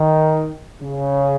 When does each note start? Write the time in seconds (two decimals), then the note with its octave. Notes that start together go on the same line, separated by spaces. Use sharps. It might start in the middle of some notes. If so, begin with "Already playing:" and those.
Already playing: D#3
0.83 C#3